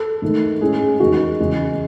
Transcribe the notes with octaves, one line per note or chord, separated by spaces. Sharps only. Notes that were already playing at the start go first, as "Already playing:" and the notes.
Already playing: A4
G#2 D#3 A3
A2 G#3 C#4 G#4
E2 D#3 G#3 F#4
E2 C#3 G#3